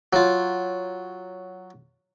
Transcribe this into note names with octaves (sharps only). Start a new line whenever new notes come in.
F#3 F4